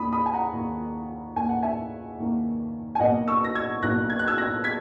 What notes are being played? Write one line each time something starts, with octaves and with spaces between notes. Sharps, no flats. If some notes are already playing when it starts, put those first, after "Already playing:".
Already playing: D#2 D#3 A#3 B5 D#6
B5 D#6
G#5
F#5 A#5
D#2 D#3 A#3
D#2 D#3 A#3 G#5
F#5
E5 G#5
D#2 D#3 A#3
G#5
B1 B2 A#3 D#5 F#5
C#6 E6
A#6
E6 G#6
B1 B2 A#3 F#6 A#6
G#6
F#6
E6 G#6
F#6 A#6
G#6 B6